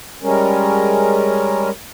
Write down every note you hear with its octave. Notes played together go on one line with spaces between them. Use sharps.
G3 G#3 C#4 A#4